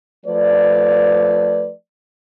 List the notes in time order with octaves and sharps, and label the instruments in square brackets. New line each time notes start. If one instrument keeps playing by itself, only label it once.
[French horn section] F3 A3 B4 D5